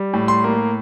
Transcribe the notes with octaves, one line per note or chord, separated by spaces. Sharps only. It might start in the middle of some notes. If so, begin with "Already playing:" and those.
Already playing: G3
A2
C6
A#3